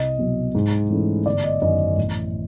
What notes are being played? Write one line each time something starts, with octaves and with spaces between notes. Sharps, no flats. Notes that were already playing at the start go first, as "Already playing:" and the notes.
Already playing: C2 D#5
B2 F#3
G#2
E3 A3 C#4 E4
G1 D5
D#5
F#2 D#3 D#5
A1